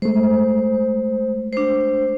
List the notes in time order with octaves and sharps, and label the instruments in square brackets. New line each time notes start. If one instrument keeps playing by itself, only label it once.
[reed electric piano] G#3 A3 [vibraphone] C5
[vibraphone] D4 C5